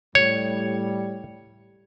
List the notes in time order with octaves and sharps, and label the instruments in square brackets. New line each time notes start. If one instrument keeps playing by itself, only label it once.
[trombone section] A2 G3 [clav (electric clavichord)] C#5